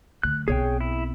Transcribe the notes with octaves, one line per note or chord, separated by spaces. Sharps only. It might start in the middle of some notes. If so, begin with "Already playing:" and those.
D2 F#3 F#6
B1 C4 G#4 C#5 G5
E4